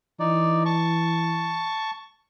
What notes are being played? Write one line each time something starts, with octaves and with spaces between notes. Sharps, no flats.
E3 D#4 D5
A5 C#6